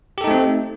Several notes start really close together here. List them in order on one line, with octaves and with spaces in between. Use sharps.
G4 A4 D#4 A3 C4